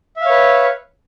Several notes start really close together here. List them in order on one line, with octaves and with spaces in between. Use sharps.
E5 F5 C#5 B4